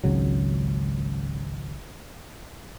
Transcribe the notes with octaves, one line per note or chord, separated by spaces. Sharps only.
G#1 C#2 C#3 F#3